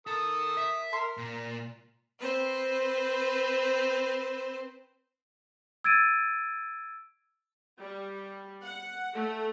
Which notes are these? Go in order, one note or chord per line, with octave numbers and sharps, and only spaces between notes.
A4 A#4 D#6
E5
A#4 C6
A#2
C4 B4 C5
E6 G#6 A6 D7 D#7
G3
F#5
A3